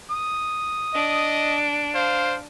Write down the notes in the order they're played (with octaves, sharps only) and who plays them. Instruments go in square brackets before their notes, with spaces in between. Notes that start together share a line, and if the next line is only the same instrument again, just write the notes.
[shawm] D#6
[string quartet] D4 [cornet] D#5
[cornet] C5 [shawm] F5